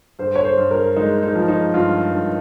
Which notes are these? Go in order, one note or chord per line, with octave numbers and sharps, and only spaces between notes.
G2 C5
C#5
C5
G2
A#4
G#3 D#4
D#4
F3
D#4
G2 F4
G2